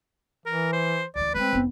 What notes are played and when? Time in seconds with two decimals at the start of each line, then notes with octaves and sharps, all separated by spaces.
0.46 E3 A#4
0.73 C5
1.16 D2 E3 D5
1.34 G#3 A3 C4 B4
1.53 F1 B3